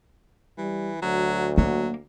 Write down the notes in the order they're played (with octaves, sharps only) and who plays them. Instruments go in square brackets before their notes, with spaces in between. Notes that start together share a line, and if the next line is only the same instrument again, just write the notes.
[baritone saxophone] E3 [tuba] G3
[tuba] D2 [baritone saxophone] F#3
[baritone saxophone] F#3 [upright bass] A#3